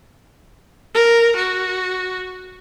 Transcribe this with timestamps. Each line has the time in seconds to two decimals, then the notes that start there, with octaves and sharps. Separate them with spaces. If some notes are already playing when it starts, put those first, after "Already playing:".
0.94 A#4
1.36 F#4